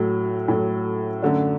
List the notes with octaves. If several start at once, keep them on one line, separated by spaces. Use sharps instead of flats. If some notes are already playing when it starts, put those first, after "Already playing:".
Already playing: A2 F#3 A3
A2 F#3 A3
F#2 D3 A3 D4